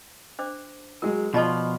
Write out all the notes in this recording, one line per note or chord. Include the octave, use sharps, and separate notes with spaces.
D4 C5 D6
F#3 G#3 A#4
B2 F3 F4 D5 D#5 A5